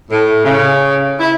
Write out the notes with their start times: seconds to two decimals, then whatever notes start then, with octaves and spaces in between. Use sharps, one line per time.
0.10 A2
0.45 C#3
1.19 E4